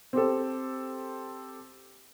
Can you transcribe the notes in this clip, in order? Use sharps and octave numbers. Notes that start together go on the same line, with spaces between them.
C4 G4 A4